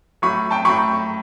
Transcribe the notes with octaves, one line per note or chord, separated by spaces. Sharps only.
A2 F#3 B5 C#6
G5 A5
A2 F#3 B5 C#6